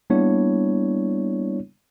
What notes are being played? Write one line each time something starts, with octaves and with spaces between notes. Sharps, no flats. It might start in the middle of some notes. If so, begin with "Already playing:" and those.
G3 A#3 B3 D4 E4 C#5